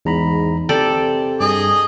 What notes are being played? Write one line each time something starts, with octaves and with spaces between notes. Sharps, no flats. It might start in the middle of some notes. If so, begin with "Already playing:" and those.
E2 G#2 A#5 B5
C3 A4 D5 G5
G2 G#4 D#5